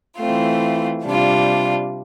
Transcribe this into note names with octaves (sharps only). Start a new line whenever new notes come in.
E3 A3 C4 F4
C3 G3 D4 F4